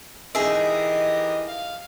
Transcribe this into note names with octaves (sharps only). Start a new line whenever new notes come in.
E3 D#4 G4 G#4 A#4 D#5 E5 D#6
F5